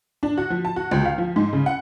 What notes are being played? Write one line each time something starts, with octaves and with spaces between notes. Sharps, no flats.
D4
F#4
F3
A5
F#4
C#2
F5
F3
G#2
C#3
F#5